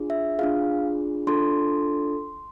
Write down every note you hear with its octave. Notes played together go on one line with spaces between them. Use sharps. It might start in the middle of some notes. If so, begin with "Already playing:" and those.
Already playing: D4 F4 G#4
E5
D4 F4 G#4 F5
D4 F4 A4 C6